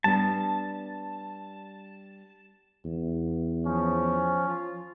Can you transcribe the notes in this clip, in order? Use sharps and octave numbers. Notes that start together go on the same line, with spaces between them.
G3 B3 D4 A5
E2
F3 C#4
F4